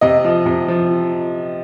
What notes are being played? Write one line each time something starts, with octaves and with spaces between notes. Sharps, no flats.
C3 D#5
F3
C3
F3